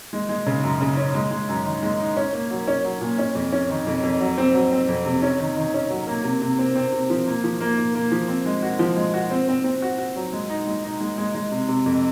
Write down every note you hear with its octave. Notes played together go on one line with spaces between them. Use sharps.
G#3
G#3
C#3
F#2
C#3
C#4
G#3
G#3
F#2
D#3
G#3
D#4
C#4
A#3
F#3
C#4
F#3
A#2
C#4
F2
C#4
D#3
F2
F2
F#3
C4
F#3
C4
F2
C3
C#4
D#3
D#3
C#4
F#3
A#3
C3
C3
C4
C4
C3
F3
A#3
F3
A#3
A#3
A#3
F3
C4
G#3
F#4
F3
G#3
F#4
C4
C4
C4
F#4
F#4
F#3
G#3
D#4
G#3
D#4
G#3
G#3
G#3
C3
C3
F2